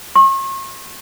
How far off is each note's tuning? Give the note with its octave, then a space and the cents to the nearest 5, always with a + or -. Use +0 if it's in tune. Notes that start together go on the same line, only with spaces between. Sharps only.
C#6 -45